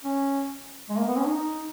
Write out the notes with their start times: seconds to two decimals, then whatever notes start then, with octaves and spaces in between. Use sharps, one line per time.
0.04 C#4
0.89 G#3
0.98 A#3
1.07 B3
1.17 C#4
1.25 D#4